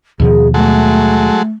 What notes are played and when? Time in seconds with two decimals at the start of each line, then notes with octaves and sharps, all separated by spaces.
0.20 D#2 B2 F3 G#4
0.54 F#3 G#3 A3 A4